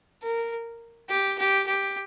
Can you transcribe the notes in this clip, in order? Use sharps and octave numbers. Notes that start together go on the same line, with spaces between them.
A#4
G4
G4
G4